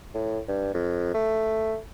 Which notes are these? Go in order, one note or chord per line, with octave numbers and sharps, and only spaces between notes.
A2
G2
F2
A3